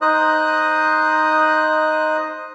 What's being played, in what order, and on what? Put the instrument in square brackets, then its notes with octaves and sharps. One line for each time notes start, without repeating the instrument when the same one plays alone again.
[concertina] D#4 C5 D#5 D#6 F#6